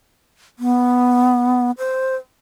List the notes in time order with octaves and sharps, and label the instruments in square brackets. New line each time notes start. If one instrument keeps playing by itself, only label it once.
[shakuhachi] B3
C5